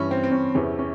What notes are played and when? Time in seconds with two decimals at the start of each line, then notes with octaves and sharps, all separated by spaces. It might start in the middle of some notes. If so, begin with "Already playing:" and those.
Already playing: G2 E3 C#4
0.11 C4
0.24 C4
0.32 C#4
0.55 E2 C3 E3 C#4
0.79 C#4